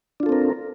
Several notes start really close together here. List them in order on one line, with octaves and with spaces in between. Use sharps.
D4 F4 A4 C4 A#4